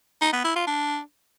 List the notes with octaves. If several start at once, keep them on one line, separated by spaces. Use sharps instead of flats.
D#4
B3
E4
F4
D4